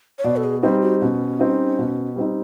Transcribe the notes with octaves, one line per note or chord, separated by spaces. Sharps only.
C#5
B2 D5
A4
G#4
G3 C4 D#4 G4
F#4
B2 C#4
G3 C4 D#4
B2
G3 C4 D#4